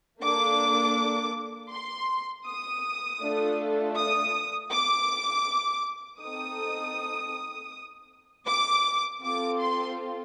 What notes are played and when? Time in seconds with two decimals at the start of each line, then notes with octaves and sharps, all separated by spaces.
0.21 A#3 D4 A4 D6
1.71 C6
2.46 D#6
3.21 A3 D4 F4 A4
3.97 D#6
4.71 D6
6.21 C4 D#4 A4 D#6
8.46 D6
9.21 C4 F4 A4 D6
9.59 C6